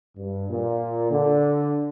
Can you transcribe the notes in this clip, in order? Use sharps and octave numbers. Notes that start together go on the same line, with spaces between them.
G2
A#2
D3